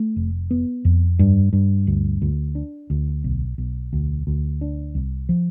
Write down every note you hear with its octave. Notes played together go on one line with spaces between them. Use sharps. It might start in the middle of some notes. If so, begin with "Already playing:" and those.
Already playing: A3
F1
B3
F2
G2
G2
D2
D2
D4
D2
B1
B1
D2
D2
D4
C2
F3